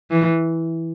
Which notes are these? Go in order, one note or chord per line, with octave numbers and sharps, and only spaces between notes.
E3